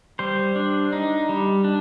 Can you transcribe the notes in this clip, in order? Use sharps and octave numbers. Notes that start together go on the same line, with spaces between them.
G3 C5
D4
D#4
G3
D4